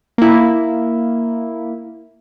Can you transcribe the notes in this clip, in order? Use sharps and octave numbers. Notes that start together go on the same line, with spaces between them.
A#3 E4